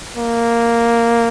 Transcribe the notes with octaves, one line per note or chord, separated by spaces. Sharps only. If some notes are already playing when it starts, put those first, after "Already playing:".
A#3